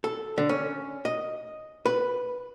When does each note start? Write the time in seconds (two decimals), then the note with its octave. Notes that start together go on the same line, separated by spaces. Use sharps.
0.04 A4
0.38 D3
0.49 C#4
1.05 D#5
1.86 B4